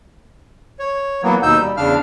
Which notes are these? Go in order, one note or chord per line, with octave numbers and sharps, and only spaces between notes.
C#5
E3 F#3 A#3 B3
D#2 B2 D#4 E6 G6
G3
E2 C#3 D4 F5 F6